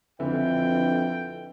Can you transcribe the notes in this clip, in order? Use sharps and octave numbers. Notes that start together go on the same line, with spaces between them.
F2 D3 E3 G5